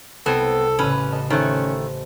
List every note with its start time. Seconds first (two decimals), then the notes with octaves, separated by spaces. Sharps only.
0.26 C2 B3 C4 A4 G#6
0.79 A1 C#3 C#4 B4
1.12 A4 D#5
1.30 D#3 A3 C#4 A4 C5 F#6